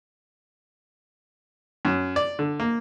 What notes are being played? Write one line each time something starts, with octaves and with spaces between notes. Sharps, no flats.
F#2
D5
D3
A#3